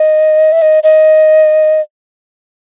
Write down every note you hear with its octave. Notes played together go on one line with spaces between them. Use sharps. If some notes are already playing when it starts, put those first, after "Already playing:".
Already playing: D#5
E5
D#5
D#5